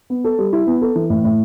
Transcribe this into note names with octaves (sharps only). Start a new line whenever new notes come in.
B3
A4
G3
E4
B3
A4
E3
A2
A2